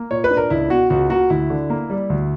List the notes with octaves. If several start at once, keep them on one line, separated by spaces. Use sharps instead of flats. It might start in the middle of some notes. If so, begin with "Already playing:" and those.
Already playing: A#3
A#2 C#5
B4
D4
A#4
C#2 E4
B2 F#4
C#2 F#4
A#3 F#4
D2 E4
D3
A#3
G3
D2